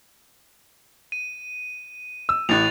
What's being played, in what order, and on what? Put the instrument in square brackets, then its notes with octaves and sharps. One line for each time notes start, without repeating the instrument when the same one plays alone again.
[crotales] D#7
[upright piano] E6
[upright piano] A1 A2 [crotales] F#6 A6 F7